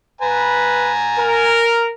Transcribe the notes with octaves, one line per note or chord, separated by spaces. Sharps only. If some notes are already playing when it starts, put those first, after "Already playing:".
B4 G#5 A#5
A#4